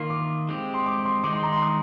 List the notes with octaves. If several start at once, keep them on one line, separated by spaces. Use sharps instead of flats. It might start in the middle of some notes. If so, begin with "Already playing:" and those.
Already playing: D#3 A#3 F4
D6
G#3 C4 G4
C6
D6
C6
D#3 G#3 D#4 D6
C6
A#5
C6
D#6